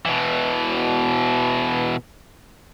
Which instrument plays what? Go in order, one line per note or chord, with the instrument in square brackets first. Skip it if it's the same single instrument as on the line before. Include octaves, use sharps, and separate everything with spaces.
[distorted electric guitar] B2 E3